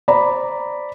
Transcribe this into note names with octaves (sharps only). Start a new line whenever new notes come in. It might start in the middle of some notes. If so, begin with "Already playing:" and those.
C5 D5 A#5 B5